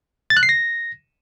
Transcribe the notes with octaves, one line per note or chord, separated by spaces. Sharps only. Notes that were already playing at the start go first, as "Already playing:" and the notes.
A6
F#6
C7
A#6